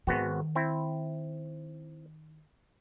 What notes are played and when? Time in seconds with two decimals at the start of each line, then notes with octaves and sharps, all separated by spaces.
0.07 G#1 D#3 B3 F#4
0.55 C4 E4